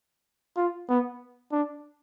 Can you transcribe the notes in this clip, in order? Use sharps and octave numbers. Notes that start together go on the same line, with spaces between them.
F4
B3
D4